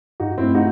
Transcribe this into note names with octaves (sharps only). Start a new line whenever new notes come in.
G2 D#4 F#4
C4 E4
A3
D#4 F#4